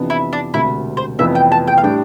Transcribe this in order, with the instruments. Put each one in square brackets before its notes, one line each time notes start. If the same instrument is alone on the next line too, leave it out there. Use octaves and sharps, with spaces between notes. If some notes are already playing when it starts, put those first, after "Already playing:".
Already playing: [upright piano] F2 C3 E3 B3 D4
[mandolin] E4
D4
[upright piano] E1 D2 C3 [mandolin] E4
[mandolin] C5
[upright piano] F1 F2 E3 B3 [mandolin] E5
[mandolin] G5
A5
G5
F5
[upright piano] A2 G3 D4 [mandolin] G5